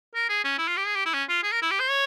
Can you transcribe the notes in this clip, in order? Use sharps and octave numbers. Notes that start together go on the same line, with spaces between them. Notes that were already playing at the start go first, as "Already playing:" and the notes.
A#4
G#4
C#4
E4
F4
G4
G#4
G4
E4
C#4
F4
G#4
A#4
E4
G4
C5
C#5